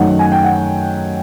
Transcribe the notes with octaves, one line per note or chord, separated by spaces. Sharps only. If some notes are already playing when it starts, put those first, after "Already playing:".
Already playing: F#2 D#3 F#3 A3 F#5
G#5
G5
F#5